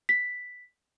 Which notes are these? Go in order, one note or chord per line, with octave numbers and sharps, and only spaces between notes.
B6